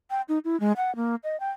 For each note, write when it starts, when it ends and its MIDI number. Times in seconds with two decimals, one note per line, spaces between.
0.10 0.21 79
0.29 0.39 63
0.45 0.59 64
0.60 0.72 56
0.77 0.94 78
0.96 1.15 58
1.24 1.39 75
1.40 1.50 79